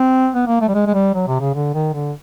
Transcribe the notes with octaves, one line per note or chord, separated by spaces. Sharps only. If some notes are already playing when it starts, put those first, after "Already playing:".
Already playing: C4
B3
A#3
A3
G3
G#3
G#3
G3
F#3
C3
C#3
D3
D#3
D3